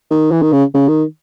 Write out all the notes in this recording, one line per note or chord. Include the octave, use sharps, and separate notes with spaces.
D#3
E3
D#3
C#3
C#3
D#3